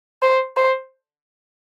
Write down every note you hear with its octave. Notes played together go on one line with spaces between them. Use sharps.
C5
C5